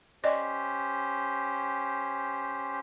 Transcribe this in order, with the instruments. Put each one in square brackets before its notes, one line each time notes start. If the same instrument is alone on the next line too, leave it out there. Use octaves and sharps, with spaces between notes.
[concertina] C#4 G4 C5 [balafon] D5 D#5